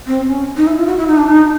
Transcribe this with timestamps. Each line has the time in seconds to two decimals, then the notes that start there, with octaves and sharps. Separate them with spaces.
0.07 C4
0.27 C#4
0.57 D#4
0.67 E4
0.77 F4
0.87 F#4
0.98 E4
1.07 D#4
1.17 D4
1.28 D#4